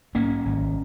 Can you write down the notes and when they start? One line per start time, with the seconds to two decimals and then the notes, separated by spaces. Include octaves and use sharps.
0.15 G#2 A#3 C#4
0.45 G#1